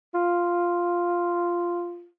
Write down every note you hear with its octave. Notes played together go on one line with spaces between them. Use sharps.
F4